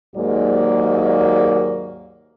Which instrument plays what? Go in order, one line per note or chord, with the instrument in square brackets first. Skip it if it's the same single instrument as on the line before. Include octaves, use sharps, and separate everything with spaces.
[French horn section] D#2 G#2 F#3 G#3 A#3 D5